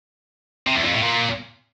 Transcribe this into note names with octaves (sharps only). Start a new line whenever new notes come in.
C3
E2
F2
A2
A#2